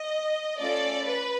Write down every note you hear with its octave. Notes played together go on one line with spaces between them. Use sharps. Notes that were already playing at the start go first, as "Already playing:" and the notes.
Already playing: D#5
A3 C#4 F4 A4 D5
B4